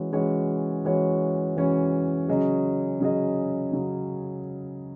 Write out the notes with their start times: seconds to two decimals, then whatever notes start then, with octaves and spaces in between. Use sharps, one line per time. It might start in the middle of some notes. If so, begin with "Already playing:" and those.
Already playing: E3 G#3 C#4 F#4 C#5
0.13 E3 G#3 C#4 F#4 C#5
0.85 E3 G#3 C#4 F#4 C#5
1.57 E3 G#3 C#4 F#4 C#5
2.28 C#3 F#3 C#4 G#4 D#5
3.00 C#3 F#3 C#4 G#4 D#5
3.72 C#3 F#3